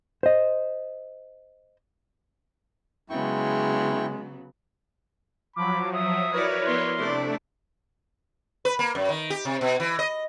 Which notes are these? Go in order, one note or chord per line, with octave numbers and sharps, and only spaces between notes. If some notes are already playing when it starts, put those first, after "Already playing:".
C5 D#5
C#3 F#3 G#3 B3 E4 G5 C#6
F3 F#3 B5 D6
E5 D#6
E4 F#4 A#4 B4 C#5 D5
F3 B3 D5 C6
C3 A3 D4 E4 D5
B4
A#3
F#2
D#3
G4
C3
B2
E3
D#5